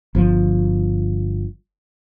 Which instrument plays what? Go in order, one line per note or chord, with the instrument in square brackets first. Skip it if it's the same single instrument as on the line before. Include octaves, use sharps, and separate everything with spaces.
[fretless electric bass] G1 F3